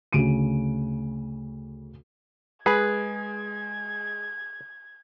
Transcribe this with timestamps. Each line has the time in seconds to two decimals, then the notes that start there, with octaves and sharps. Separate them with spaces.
0.13 D2 C#3 D7 D#7
2.66 G#3 G#4 B4 G#6